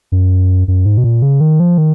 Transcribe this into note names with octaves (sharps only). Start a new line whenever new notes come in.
F#2
F#2
G#2
B2
A#2
C#3
D#3
F3
D#3